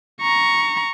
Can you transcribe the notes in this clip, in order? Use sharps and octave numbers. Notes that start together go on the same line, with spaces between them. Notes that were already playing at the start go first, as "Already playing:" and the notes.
A#5 C#6